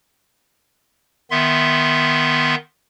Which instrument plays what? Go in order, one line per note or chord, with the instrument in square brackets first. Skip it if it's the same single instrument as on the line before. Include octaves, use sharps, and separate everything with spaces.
[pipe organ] D#3 B3 E5 C6